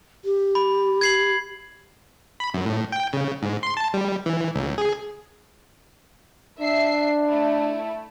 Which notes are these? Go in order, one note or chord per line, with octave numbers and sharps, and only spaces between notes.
G4
B5
G#6 C7 F#7
B5
F#2
A2
G5
C#3
G#2
C6
A5
G3
E3
C#2
G#4
D4 E5 C7
A3 E4